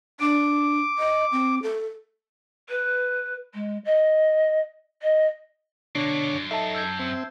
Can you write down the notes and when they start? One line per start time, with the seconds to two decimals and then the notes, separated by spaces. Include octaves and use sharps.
0.20 D4 D6
0.98 D#5
1.32 C4
1.63 A4
2.70 B4
3.54 G#3
3.85 D#5
5.03 D#5
5.95 B2 D3 A#3 D4 C#5 D6 C7
6.12 B2
6.30 F#2
6.51 D#4 A4 E5 A5 C7
6.75 E6 G6 G#6
6.99 C4